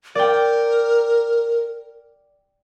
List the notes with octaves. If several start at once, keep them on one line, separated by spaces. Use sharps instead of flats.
A#4 D5 G5